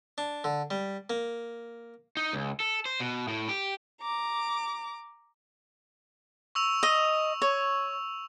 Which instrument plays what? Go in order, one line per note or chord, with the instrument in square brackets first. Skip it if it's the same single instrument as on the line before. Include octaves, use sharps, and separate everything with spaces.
[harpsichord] D4
D3
G3
A#3
[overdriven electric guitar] D#4
C#2
A4
C5
B2
A2
G4
[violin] A#5 D6
[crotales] C#6 E6 F7
[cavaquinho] D#5
C#5